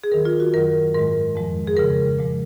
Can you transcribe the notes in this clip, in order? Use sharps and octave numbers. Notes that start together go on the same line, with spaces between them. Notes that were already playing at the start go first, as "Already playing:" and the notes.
G#4
D#2 D#3 F#3 A#4
F4
F#4
F#2 D#3 F#3 A#4
G#2 D#3 G#3 A#4
F2 F3 G#3
G#4
D#2 C#3 F3 G#3 A#4
A#2 F3 G#3